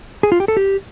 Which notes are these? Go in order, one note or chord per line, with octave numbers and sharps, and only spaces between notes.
G#4
F4
G4
A4
G4